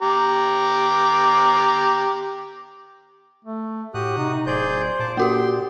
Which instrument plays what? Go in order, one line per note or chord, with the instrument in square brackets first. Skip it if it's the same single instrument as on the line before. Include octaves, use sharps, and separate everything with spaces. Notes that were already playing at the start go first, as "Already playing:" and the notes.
[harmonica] G4 A#5
[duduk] A3
[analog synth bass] A2 [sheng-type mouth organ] F#4 D#6 F#6 [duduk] G4
[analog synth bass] C3 [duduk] D#4
[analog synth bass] D1 [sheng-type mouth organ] G#4 D5 G6 [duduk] C5
[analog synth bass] A#2 [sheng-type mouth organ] A5 D6
[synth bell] A#3 F#4 G4 [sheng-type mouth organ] G5 C6